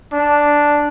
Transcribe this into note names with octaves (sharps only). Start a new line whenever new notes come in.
D4